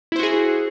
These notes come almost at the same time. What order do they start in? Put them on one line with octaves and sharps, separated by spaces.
E4 C5 F#4 G#4